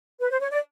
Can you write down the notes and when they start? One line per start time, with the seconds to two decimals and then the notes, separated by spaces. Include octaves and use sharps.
0.20 B4
0.30 C5
0.40 C#5
0.51 D5